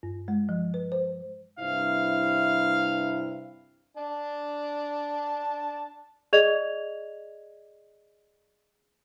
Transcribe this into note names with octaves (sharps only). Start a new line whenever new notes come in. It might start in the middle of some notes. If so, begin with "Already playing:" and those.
G2
G#3
F3
B4
C5
G2 C3 E4 F5
D4 A5
G#4 D5 D#5 G#6 F7